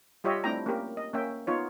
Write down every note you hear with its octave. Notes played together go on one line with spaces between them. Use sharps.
G3 F4 G4 C#5 D#5 E5
A3 C4 D4 E4 G5 A#5
A#3 C#4 G4 A#4
D#5
A#3 C#4 E5 G5
B3 D#4 F4 C#5